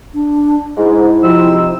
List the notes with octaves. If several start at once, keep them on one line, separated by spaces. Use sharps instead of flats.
D4
G#2 E4
C3 F3 C4 D#4 E6